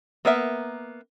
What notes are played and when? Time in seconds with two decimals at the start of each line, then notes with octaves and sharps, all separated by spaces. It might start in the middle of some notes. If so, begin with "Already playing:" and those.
0.25 A#3 B3 A#4 E5